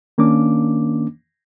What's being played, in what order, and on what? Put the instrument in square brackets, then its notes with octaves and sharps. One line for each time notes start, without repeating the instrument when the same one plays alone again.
[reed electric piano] D#3 A#3 C#4 D4 D6